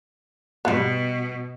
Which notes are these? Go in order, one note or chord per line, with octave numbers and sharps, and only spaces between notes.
B2 G3 B3